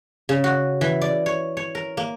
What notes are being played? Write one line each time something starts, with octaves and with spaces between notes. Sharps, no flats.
C#3
F#4
E3
D5
C#5
C#5
A#4
A#3